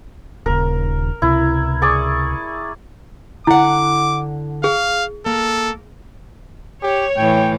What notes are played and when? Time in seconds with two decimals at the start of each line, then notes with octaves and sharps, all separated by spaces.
0.46 D#1 D#2 C#3 A#4
1.22 C#2 C3 E4
1.82 G#4 D5 C#6
3.47 D3 E4 F#5 D6
4.64 G#4 F5
5.26 A#3 A4
6.83 G4 C#5
7.17 A2 E3 G5